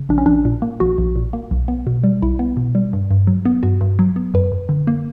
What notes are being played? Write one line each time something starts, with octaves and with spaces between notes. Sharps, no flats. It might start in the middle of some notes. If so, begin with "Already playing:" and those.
Already playing: C#3
A#1 D4
C#4
A#1 D4
A#2
A#3
A#1 F#4
A#1
A#2
A#3
B1
B3
B2
G3
B1 E4
B3
B2
G3
G2
G2
F#3
B3
G2 F#4
G2
F#3
B3
F#2 B4
F#2
D3
A#3